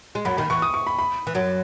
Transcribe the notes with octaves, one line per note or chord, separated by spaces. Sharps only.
G#3
F#2 F#3 B5
D#2 D#3 B5
E2 E3 C#6
D#6
C#6
B5
B5
E3
F#2 F#3